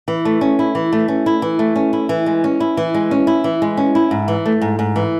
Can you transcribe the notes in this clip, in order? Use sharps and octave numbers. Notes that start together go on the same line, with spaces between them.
E3
A3
C#4
E4
E3
A3
C#4
E4
E3
A3
C#4
E4
E3
G#3
C#4
E4
E3
G#3
C#4
E4
E3
G#3
C#4
E4
G#2
E3
A3
G#2
G#2
E3